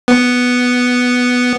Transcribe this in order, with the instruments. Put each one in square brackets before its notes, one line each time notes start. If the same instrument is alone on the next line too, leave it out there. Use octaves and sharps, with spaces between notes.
[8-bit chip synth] B3